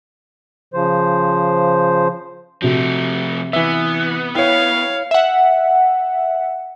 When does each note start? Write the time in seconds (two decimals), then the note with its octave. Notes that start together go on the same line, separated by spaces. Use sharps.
0.74 C#3 F3 C5
2.62 C3 F3 A3 F#4
3.53 E3 B3 E5
4.35 E4 C#5 F5 G5
5.11 E5 F#5